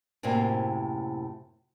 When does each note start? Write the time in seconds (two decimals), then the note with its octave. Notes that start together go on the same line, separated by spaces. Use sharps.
0.23 F#2 A2 C3 A#3 C4